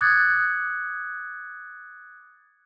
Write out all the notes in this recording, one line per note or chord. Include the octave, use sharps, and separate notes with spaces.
D6 D#6 F#6 G#6 A6 C#7